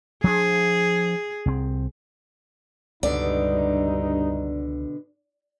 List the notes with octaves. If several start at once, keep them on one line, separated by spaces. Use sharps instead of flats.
F3 D4 G#4
C2 C4
C#2 G2 B2 D3 G3 D#4 D5